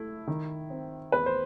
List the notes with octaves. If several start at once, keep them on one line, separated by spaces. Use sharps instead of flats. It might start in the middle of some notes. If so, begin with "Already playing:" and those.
Already playing: A3 E4
D#3
C4
E2 B4
C5